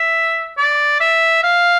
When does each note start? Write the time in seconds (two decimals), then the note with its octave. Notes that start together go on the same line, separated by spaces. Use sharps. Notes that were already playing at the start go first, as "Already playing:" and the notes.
Already playing: E5
0.58 D5
1.00 E5
1.43 F5